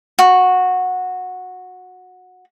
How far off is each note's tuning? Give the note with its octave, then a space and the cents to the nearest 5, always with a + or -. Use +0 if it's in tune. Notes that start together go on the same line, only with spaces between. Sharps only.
F#4 -15